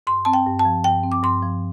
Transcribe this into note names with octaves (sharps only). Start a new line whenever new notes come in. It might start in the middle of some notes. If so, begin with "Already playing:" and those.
G2 C6
C4 A5
G5
G2
A5
F3
G2 G5
C4
D6
G2 C6
F3